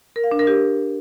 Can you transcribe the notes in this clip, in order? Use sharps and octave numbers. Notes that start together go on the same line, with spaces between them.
A#4
F5
D4
A#4
G4